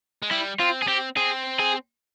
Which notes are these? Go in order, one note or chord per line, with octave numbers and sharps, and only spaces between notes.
G#3
G3 E4
C4 F4
G#4
C4 G4
C4 G#4
G#4